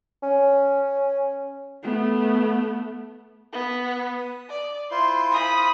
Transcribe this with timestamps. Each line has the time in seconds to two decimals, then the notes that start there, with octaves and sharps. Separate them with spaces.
0.23 C#4
1.83 A3 B3
3.53 B3
3.85 B4
4.18 D#6
4.49 D5
4.91 E4 F4 C5 C6
5.32 B5 D#6